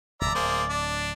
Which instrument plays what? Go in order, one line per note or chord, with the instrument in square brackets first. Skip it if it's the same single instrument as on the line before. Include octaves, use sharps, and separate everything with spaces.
[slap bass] D1 G1 [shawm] D5 [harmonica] E5 A#5
[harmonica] A#3 G#4 C5
D4